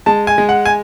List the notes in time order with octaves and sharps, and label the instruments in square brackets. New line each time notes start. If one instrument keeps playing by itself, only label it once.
[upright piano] G#3 A5
G#5
G#3
F#5
G#5